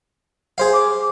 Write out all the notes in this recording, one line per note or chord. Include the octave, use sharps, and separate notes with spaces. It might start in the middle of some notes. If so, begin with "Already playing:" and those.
G#4 C5 F5
D6